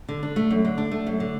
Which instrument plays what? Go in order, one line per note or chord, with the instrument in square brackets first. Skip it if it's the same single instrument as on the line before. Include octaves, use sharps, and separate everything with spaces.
[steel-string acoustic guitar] D3
D4
A3
F#2
D3
D4
A3
F#2
D3